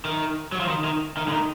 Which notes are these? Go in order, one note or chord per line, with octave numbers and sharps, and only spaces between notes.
D#3
F#3
F3
D#3
D#3
D#3
D3
D#3